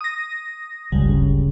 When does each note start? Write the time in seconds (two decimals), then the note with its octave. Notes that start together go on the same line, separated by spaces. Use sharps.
0.01 D#6 A#6
0.92 G1 C#2 G3
1.09 D1 C#3